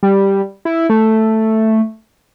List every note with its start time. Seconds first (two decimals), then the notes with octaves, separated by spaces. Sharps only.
0.03 G3
0.65 E4
0.90 A3